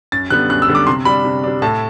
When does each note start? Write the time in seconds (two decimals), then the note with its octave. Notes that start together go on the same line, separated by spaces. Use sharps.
0.12 F#2 A6
0.30 D3 G3 B3 F#6
0.50 F#2 F#6
0.62 E6
0.68 D3 G3 B3
0.75 D6
0.87 C3 C6
1.05 G3 D4 B5
1.25 C3
1.44 G3 D4
1.62 A2 A5